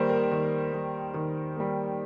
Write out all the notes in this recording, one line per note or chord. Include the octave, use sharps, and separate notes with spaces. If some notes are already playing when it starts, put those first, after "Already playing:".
Already playing: D#3 G3 A#3 C5
A#4
D#3
G3 A#3
D#3
G3 A#3